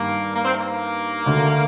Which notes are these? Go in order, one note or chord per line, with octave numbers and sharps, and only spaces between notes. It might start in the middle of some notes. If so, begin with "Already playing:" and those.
Already playing: G2 D#3 G3 A#3
A#3
C4
A#3
D2 D3 A3